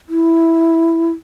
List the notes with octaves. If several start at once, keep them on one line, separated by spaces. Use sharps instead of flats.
E4